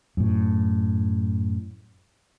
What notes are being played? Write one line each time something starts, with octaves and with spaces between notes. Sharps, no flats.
F#2 A2